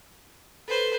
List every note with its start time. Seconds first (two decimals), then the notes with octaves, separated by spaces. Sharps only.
0.68 A4 B4 C5